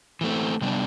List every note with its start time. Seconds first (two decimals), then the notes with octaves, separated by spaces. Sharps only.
0.21 E3 A3 C4
0.61 C3 G3 B3 D4